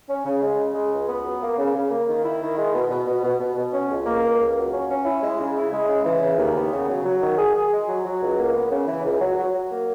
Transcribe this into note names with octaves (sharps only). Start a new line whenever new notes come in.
C#4
C#3
G#3
C#3
G#3
C#2
B3
F#3
A#3
C#3
C#3
A#3
D#3
E4
D#3
G#3
B2
B2
B2
B2
B2
B2
C#4
C#2
A#3
C#2
C#2
F#3
C#4
C#4
E4
G#3
C#3
E4
G#3
C#3
E3
C#3
D#2
B3
C#3
F#3
F#3
D#3
G#4
G#4
G#3
F#3
F#3
C#2
A#3
B3
C#3
E3
C#2
F#3
F#3
F#3
A#3